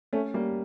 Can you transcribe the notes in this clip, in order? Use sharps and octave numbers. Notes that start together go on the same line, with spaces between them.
A3 C#4
G3 A#3